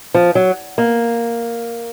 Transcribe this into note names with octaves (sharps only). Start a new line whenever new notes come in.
F3
F#3
A#3